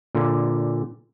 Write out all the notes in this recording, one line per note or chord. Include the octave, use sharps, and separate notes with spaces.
A#2 D3